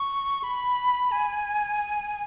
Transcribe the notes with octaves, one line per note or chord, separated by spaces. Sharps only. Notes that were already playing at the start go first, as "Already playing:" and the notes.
Already playing: C#6
B5
G#5